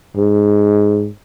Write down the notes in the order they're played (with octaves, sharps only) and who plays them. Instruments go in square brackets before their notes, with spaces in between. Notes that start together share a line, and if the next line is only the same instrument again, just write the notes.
[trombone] G#2